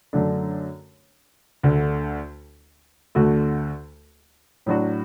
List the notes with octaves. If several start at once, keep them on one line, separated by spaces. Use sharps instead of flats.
F#2 D3 A3 D4
D2 D3 A3 D4
D2 D3 A3 F#4
A2 F#3 D4 F#4